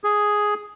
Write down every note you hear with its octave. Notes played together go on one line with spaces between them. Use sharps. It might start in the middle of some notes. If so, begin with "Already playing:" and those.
G#4